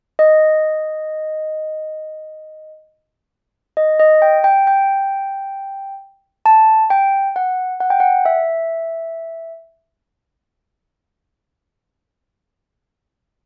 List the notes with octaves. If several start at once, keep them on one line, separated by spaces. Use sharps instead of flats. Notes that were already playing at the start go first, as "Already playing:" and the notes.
D#5
D#5
D#5
G5
G5
G5
A5
G5
F#5
F#5
G5
F#5
E5